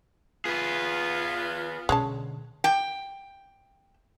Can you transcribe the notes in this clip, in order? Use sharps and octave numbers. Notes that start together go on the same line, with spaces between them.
B3 F4 G#4 B4
B2 D3 G#3 C#4 A5
G5